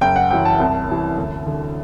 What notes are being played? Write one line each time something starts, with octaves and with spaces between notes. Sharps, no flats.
F#1 G5
F#5
F#2 E3 G5
A5
C2
C3 E3
D2
D3